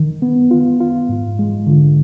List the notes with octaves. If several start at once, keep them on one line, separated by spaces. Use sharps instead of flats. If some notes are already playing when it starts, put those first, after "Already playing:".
Already playing: D#3
B3
F4
F4
G#2
G#3
D3